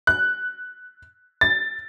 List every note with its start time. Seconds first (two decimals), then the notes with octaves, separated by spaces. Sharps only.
0.07 F#6
1.41 A6